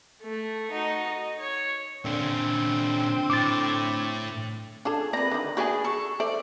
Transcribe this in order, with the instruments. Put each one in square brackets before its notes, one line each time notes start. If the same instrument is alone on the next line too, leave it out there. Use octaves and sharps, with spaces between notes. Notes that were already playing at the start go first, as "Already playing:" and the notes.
[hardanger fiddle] A3
D#4 F#4
D#5
C#5
[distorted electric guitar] A#2 C#4 [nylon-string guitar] D3 [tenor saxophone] C4
[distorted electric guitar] A2 [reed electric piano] D6 A6
[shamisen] D4 F4 A4 [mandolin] G#4
[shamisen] C4 A#4 D5 [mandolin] B4 A#5
[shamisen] D3 D#3
[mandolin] B3 D4 G#4 [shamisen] F#4 E5 G#5
[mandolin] A4 C#6
[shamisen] A4 C5 E5 [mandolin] D5